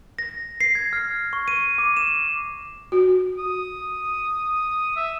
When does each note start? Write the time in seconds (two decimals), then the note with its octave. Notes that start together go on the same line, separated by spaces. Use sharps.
0.19 A#6
0.61 C7
0.75 G#6
0.93 F6
1.33 C#6
1.48 D#7
1.78 D6
1.97 E7
2.92 F#4
3.38 D#6
4.96 E5